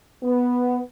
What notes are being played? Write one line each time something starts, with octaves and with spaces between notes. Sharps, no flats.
B3